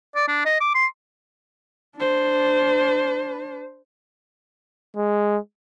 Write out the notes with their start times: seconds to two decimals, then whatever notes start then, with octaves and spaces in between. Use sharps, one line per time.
0.15 D5
0.28 D4
0.46 D#5
0.60 D6
0.75 C6
1.97 D4 C5
4.97 G#3